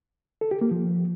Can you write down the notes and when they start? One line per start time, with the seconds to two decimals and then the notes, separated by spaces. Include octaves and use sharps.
0.41 A4
0.51 G4
0.61 A#3
0.71 F3